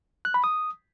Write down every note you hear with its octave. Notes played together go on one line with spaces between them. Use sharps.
F#6
B5
D#6